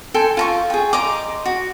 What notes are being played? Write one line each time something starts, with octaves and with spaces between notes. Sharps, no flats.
A4 G5 G#5 C6
F4 A#5 C#6
G#4 G5
D#5 A#5 C6 D6
F#4